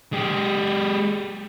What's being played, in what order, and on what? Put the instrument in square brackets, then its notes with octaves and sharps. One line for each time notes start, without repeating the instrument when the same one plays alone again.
[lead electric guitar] G#3 G4